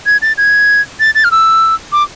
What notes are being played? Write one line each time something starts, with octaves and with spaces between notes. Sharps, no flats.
G#6
A6
G#6
A6
A6
F6
E6
D6